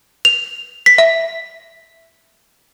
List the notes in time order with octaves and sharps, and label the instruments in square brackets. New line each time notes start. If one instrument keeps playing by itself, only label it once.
[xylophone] F7
B6
E5